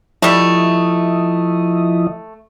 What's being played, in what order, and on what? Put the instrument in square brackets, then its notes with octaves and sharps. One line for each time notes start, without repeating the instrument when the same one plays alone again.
[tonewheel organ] F3 E4 D#5 [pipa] G3 A3